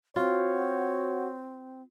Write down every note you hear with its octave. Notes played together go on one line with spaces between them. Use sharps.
C4 F4 F#4 C#5